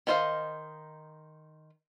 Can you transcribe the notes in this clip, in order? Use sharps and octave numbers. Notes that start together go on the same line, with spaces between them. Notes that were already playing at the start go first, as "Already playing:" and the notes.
D#3 D#4 C5 D#5 F5